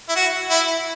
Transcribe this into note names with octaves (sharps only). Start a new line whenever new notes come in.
E4
F#4
E4